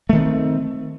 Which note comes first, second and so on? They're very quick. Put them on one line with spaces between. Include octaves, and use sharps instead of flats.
A3 D#3 C4